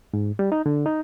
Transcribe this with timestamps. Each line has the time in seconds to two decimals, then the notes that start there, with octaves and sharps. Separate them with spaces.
0.14 G#2
0.39 G3
0.52 D#4
0.66 D3
0.86 D#4